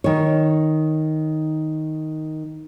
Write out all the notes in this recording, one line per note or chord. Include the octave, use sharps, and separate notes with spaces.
D#3 C#5